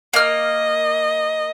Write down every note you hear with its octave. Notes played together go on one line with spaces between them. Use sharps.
A#3 D#5 F6